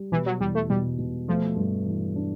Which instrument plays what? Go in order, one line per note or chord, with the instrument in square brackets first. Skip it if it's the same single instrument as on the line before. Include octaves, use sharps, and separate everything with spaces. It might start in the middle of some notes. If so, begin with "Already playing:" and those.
Already playing: [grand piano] G3
[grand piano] B2 [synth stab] E3
[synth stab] F#3
[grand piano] E2 [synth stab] G3
[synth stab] A3
[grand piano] B2 [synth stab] G3
[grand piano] B2
[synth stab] F3 [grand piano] A3
[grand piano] G2
E3
D4